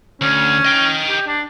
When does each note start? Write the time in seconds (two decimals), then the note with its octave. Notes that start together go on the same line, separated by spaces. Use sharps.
0.21 D2 C#4
0.65 D#5 G5
1.10 G4
1.27 D4